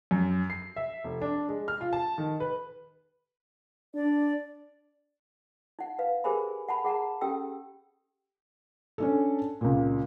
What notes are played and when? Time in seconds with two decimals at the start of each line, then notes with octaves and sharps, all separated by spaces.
0.11 F#2
0.50 C7
0.76 E5
1.04 F1
1.22 D4
1.49 G#3
1.68 F6
1.81 F4
1.93 A5
2.18 D#3
2.40 B4
3.94 D4 D5
5.79 D#4 F#5
5.99 B4 F5
6.24 G4 G#4 A#4 C5 G#5 B5
6.68 F#5 A5 B5
6.85 G#4 F#5 A5 A#5
7.21 C#4 G4 A4 G5 E6
8.98 C#4 D4 A4
9.61 C#2 A#2